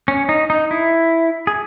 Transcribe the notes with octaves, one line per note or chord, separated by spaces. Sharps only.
C#4
D#4
D#4
E4
G#4